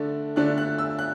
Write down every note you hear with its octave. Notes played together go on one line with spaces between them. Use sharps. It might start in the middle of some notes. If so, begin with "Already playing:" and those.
Already playing: D3 A3 D4
D3 A3 D4 F#6
F#6
E6
F#6